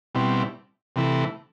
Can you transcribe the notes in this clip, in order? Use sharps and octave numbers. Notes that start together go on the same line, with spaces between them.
B2 G3 C4 E4
C3 E3 A3 E4